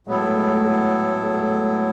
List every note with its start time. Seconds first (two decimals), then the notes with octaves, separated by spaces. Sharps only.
0.07 A2 F#3 G#3 B3 E4 A4
0.22 A3
0.36 G#3
0.50 A3
0.65 A3
1.23 A3
1.30 G#3
1.37 A3
1.52 G#3